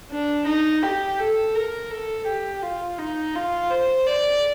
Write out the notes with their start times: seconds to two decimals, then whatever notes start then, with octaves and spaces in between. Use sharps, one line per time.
0.11 D4
0.46 D#4
0.82 G4
1.19 A4
1.55 A#4
1.90 A4
2.27 G4
2.62 F4
2.98 D#4
3.35 F4
3.70 C5
4.06 D5